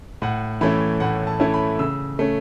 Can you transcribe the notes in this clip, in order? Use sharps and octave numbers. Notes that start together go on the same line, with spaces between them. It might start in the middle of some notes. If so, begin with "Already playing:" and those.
A2 F#5
E3 A3 C#4 E4 B5
A2 F#5
A5
E3 A3 C#4 E4
B5
C#3 E6
A3 C#4